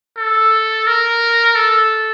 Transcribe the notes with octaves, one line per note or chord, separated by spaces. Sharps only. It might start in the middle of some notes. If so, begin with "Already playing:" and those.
A4
A#4
A4